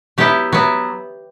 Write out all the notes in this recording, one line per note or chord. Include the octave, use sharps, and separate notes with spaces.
F#3 B3 E4 G4
F#3 B3 E4